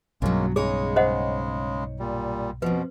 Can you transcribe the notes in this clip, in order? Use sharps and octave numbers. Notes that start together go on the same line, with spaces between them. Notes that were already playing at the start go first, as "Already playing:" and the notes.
B1 G2 B2 F#3 G#3 A#3 C#4
C#3 G#3 D#4 G#4 C#5
C5 D#5 F#5
A#2 G3
F2 B2 F3 B4